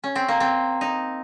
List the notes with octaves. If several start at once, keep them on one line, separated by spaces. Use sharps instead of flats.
C#4
C4
A#3
C4
D#4